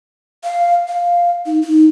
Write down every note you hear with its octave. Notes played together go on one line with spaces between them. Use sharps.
F5
F5
D#4
D#4